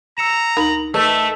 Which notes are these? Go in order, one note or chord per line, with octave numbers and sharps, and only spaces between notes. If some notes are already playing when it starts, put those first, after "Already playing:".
A#5 E6 C#7 E7
D2 D#4 A#4 B5 F#7
A3 A#4 B4 D#5 E5 E6